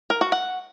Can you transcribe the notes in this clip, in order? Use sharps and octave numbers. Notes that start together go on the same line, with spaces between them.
A#4
F#4
F#5